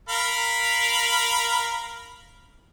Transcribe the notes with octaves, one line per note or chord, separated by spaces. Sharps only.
A#4 F5 B5